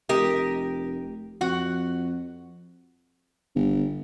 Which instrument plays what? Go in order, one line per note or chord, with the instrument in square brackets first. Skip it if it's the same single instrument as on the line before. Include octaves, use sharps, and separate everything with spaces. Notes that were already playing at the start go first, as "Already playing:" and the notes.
[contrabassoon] F1 [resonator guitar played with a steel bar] G4 A#4 D#5
[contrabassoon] F2 [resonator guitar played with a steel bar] F#4 F#5
[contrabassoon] G1